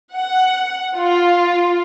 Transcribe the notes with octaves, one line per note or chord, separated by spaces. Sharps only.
F#5
F4